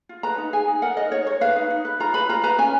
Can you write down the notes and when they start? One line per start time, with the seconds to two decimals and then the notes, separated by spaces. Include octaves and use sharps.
0.09 F4
0.23 B4 A#5
0.38 D#4
0.53 G#4 G#5
0.68 D#4
0.82 A#4 F#5
0.97 A#4 D#5
1.12 D#4 C#5
1.26 A#4 C#5
1.41 B4 F5
1.56 D#4
1.70 D#4
1.85 B4
2.00 F4 A#5
2.14 B4 B5
2.29 F4 A#5
2.43 B4 A#5
2.58 C#4 G#5